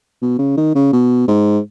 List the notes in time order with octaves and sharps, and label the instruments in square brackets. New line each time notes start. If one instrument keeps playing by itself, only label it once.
[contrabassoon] B2
C#3
D#3
C#3
B2
G#2